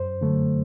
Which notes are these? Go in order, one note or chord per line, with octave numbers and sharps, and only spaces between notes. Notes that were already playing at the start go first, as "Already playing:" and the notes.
Already playing: F#2 C5
D3 F#3 A3